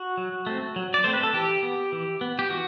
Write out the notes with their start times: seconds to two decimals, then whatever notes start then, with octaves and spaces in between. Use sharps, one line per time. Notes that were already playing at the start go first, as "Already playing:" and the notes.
Already playing: F#4
0.17 F#3
0.47 A3 C4
0.76 F#3
0.94 D5
1.04 A3 C4 C5
1.13 B4
1.23 A4
1.33 E3 G4
1.63 B3
1.92 E3
2.21 B3
2.39 G4
2.50 E3 F#4